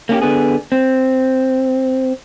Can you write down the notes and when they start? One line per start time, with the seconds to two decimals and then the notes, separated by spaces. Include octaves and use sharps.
0.09 A#3 C#4 D4 G4
0.22 D3 B3 G#4
0.72 C4